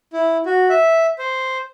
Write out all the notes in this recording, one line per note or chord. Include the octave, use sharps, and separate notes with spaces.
E4
F#4
E5
C5